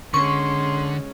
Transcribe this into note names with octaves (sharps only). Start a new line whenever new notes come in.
D3 G#3 C#4 C6 C#6